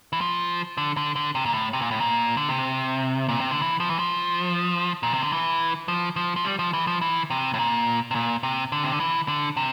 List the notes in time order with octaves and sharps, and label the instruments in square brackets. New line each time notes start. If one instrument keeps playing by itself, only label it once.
[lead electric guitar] E3
F3
D3
D3
D3
C3
A#2
A2
C3
A#2
A2
A#2
D3
C3
A#2
C3
D3
E3
F3
E3
F3
A#2
C3
D3
E3
F3
F3
F3
G3
F3
E3
F3
E3
C3
A2
A#2
C3
A#2
C3
D3
C3
D3
E3
D3
C3